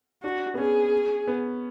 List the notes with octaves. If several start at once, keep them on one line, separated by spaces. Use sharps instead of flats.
D4 F#4
B3
C#4 G#4
B3